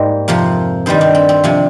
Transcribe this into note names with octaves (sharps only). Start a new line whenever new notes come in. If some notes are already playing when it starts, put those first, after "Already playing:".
Already playing: G#2 G3 A#3 C5
F2 C3 F3 A#4
G2 D#3 G3 C5
D4
C4
C4
C3 F3 D4